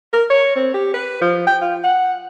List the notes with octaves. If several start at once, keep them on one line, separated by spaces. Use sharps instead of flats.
A#4
C#5
C4
G4
B4
F3
G5
F4
F#5